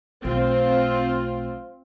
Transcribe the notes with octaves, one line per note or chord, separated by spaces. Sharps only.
B1 A3 C4 F4